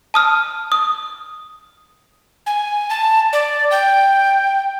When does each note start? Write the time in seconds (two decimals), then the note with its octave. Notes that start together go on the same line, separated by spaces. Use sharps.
0.14 A5 D#6 F6
0.72 D#6
2.46 G#5
2.90 A5
3.33 D5
3.71 G5